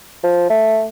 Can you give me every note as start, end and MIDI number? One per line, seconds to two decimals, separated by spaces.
0.24 0.45 53
0.50 0.86 57